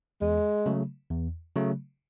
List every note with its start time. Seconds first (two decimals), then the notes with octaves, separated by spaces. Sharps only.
0.22 E2 G#3
0.66 C#3 F#3 A3
1.11 E2
1.56 C#3 F#3 A3